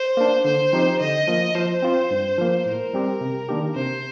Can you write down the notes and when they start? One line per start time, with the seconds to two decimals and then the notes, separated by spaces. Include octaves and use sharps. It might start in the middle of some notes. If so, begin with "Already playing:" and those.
Already playing: C5
0.17 A#3 D4
0.45 D3 C5
0.73 F3 C4 D#4 G4
1.00 D3 D#5
1.27 F3 A#3
1.55 F3 C5
1.82 C4 F4
2.11 G2
2.38 F3 A#3
2.66 A2 A#4
2.94 G3 C4 G4
3.21 C3
3.49 D#3 A#3 D4 G4
3.75 C3 C5